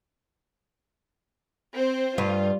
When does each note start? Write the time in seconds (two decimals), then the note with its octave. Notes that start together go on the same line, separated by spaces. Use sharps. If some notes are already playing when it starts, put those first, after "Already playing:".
1.76 C4 C5
2.18 G2 F4